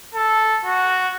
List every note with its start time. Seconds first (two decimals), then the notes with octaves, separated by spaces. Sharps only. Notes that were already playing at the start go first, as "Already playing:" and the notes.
0.15 A4
0.65 F#4